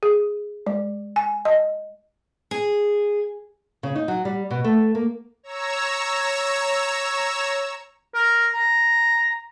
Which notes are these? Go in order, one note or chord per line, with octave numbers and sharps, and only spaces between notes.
G#4
G#3
G#5
D#5
G#4
C#3
D#4
F#3
G3
B2
A3
A#3
C#5 A#5 E6
A#4
A#5